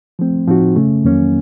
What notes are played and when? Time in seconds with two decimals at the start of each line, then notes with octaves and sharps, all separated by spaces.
0.19 F3 A3 C4
0.47 A2 F3 C4 D#4 F#4
0.76 C#3 A3 C#4
1.04 F2 D#3 F#3 A#3 C#4